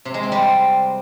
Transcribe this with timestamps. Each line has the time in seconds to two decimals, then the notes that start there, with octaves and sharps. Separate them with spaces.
0.05 C3
0.14 G#3
0.23 C4
0.32 G3